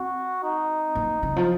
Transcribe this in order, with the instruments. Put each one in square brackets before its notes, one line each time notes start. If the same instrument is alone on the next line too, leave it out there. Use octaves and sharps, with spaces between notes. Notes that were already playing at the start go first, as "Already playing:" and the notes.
Already playing: [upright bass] C4 [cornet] F#4
[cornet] D#4
[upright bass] A#3
C#3
F3